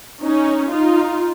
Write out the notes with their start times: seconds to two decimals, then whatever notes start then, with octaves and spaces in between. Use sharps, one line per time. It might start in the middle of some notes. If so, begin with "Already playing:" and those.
0.23 C#4 D#4
0.72 D#4 F4